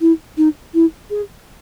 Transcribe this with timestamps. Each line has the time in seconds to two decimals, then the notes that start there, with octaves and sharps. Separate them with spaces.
0.01 E4
0.37 D#4
0.74 E4
1.11 G#4